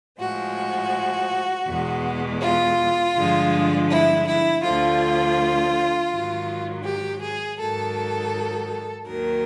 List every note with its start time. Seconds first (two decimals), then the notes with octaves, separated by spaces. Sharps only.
0.20 A2 F3 G#3 F#4
1.68 E2 B2 G#3
2.41 F4
3.16 G2 D3 F3 G#3
3.90 E4
4.26 E4
4.63 D2 D3 F3 F4
6.11 G#2 D#3 F#3
6.84 G4
7.21 G#4
7.59 G#2 D#3 F#3 A4
9.07 D#2 D#3 F#3 A#4